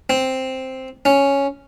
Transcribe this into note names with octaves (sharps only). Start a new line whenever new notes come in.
C4
C#4